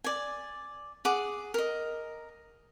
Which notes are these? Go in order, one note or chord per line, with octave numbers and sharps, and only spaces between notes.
D5 G#5
G#4 F#5 D6
A#4 D#5